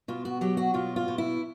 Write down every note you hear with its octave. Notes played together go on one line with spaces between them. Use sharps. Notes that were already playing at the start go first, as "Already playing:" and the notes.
B2 F4
F#4
F#3 G4
F#4
B2 F4
F4
B2
E4